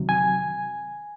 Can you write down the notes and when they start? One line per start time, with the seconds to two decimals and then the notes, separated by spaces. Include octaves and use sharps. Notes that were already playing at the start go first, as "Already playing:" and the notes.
Already playing: F2 C3 D#3 F#3
0.09 G#5